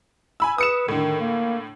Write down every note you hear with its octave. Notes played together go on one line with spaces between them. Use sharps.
G#5 B5 E6
B4 D#6 C#7 E7
A2 D3 D#3
A#3